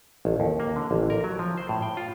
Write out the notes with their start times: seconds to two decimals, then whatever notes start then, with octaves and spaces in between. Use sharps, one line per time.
0.25 A1
0.40 D#2
0.60 A#3
0.76 D3
0.91 A1
1.10 A#4
1.24 F#3
1.39 F3
1.58 C5
1.69 A2
1.82 G5
1.97 F4